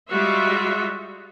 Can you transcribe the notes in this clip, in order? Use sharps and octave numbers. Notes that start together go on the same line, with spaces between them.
G3 G#3 F4 F#4 E5